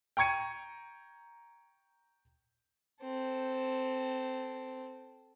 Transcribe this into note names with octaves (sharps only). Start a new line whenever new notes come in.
G5 A#5 C#6 G#6 C#7 D#7
C4 A4